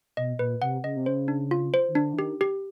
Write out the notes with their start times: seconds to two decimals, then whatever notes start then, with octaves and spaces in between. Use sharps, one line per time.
0.17 B2 D#5
0.39 A#2 B4
0.62 C3 F#5
0.83 C#3 D#5
0.96 C3
1.06 C#3 C5
1.28 D4
1.51 F4
1.74 C5
1.88 D#3
1.95 D3 D4
2.13 E3
2.18 D#3 G4
2.41 G4